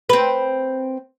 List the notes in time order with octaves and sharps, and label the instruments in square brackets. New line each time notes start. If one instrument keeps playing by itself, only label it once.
[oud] C4 B4